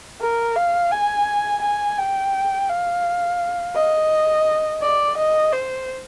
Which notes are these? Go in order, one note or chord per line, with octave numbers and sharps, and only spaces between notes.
A#4
F5
G#5
G#5
G5
F5
D#5
D5
D#5
C5